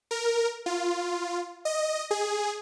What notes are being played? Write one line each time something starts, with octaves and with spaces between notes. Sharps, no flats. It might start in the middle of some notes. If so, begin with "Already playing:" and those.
A#4
F4
D#5
G#4